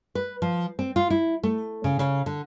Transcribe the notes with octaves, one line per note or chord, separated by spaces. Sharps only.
B4
F3
C4
F4
E4
A3
C#3
C#3
D3